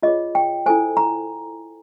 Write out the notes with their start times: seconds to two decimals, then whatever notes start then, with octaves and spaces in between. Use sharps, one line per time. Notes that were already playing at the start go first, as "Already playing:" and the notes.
0.02 F4 G#4 C#5 D#5
0.35 G5
0.66 E4 A4 C5 G#5
0.97 A#5